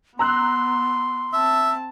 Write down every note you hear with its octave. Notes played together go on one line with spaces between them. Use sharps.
B3 A#5 C6 E6 F#6
C4 E5 A5